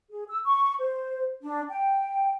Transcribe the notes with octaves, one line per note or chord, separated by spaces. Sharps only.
G#4
E6
C#6
C5
D4
G5